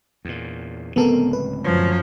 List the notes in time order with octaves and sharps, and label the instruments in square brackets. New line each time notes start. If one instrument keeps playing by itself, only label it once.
[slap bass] E2 A#2
[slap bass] D1 C#2 C4 [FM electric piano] B3 A4 A#4
[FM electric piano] B4
[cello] F#2 F3